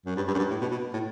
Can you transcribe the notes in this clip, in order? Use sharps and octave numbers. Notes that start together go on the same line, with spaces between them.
F#2
G2
G2
F#2
G2
A2
B2
B2
A2